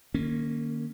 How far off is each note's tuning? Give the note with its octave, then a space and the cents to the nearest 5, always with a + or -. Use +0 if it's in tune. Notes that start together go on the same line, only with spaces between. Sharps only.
D#3 -40 A#3 +0 C#4 +0